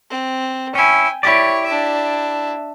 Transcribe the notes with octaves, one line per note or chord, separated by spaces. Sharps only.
C4
C#4 E4 G5 G#5
E4 G4 C#5 D5
D4 E5